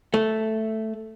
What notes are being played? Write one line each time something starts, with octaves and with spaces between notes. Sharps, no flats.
A3